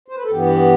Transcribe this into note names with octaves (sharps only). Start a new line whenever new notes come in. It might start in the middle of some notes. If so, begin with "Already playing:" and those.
C5
B4
A4
G2 E3 B3 G4